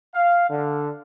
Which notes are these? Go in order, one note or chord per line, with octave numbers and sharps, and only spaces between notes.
F5
D3